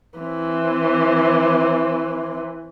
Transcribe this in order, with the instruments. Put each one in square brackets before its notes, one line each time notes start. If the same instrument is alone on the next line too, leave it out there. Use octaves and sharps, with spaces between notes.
[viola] E3 C4